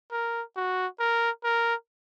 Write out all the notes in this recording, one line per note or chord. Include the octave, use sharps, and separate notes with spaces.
A#4
F#4
A#4
A#4